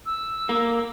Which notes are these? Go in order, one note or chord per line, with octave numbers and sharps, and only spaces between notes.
E6
A#3